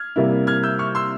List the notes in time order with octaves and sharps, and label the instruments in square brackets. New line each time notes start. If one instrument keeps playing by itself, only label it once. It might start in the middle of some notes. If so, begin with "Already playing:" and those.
Already playing: [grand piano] F6 G#6
[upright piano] C3 G3 A#3 E4
[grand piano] F6 G#6
E6 G6
C#6 F6
C6 E6